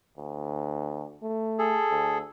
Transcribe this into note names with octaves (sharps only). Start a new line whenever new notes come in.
D2
A3
G#4 A4
D2